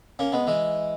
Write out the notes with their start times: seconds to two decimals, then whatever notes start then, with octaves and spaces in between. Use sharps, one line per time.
0.19 A#3 C#4
0.32 G#3 B3
0.47 E3 G#3